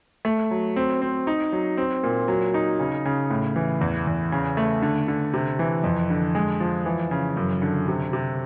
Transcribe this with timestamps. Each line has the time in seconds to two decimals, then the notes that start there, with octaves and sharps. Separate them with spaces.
0.25 A3
0.51 F#3
0.76 C4
1.01 C4
1.27 D#4
1.52 F#3
1.77 C4
2.03 A#2
2.28 F#3
2.54 D#4
2.79 C#3
3.05 C#3
3.30 A2
3.56 E3
3.81 E2
4.07 E2
4.32 C#3
4.57 A3
4.82 D3
5.08 D3
5.34 C3
5.59 E3
5.84 F2
6.10 D3
6.35 G#3
6.60 F3
6.86 E3
7.11 C#3
7.37 F#2
7.62 D3
7.88 C3
8.13 C3